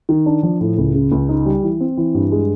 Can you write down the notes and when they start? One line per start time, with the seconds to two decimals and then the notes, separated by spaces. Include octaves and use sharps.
0.09 D#3
0.26 D4
0.43 F3
0.61 A2
0.78 C#2
0.94 C#3
1.12 C#2
1.29 D#4
1.46 G3
1.63 E3
1.80 C4
1.97 E3
2.15 G2
2.32 G#3